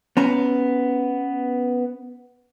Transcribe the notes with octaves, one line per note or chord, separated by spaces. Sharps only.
B3 C#4 A#5